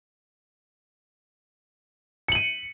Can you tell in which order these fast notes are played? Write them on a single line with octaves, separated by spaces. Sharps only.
C#7 F#7 D#7